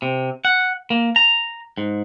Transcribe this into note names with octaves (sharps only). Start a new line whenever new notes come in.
C3
F#5
A#3
A#5
G#2